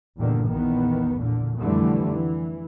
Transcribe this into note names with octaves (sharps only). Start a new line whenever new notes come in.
E2 G2 A#2 D3 D#3
A#1 E2 D#3 B3
A#2 D3
F2 D3 E3 G3 A3
E3